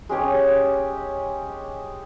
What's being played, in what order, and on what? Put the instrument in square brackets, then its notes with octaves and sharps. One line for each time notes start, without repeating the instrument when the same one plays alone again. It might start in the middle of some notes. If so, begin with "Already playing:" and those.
[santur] G#3 C#4 G4 C#5